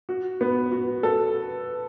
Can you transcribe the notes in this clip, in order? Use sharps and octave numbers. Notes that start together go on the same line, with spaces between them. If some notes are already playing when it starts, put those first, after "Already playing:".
F#4
B3
F#4
A4